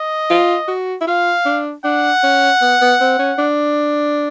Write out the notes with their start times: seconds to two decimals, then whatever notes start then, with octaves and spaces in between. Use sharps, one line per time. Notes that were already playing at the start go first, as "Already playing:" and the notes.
Already playing: D#5
0.30 F4
0.68 F#4
1.01 E4
1.07 F4 F5
1.45 D4
1.85 D4 F#5
2.23 C#4
2.62 B3
2.81 B3
3.00 C4
3.19 C#4
3.38 D4